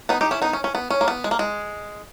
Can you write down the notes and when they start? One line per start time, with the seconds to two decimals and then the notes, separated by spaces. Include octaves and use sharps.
0.09 B3 D#4
0.21 D#4 G4
0.31 C#4 E4
0.42 B3 D#4
0.53 C#4
0.64 C#4
0.75 B3
0.91 C#4
1.01 A#3
1.08 B3
1.24 G#3
1.31 A#3
1.39 G#3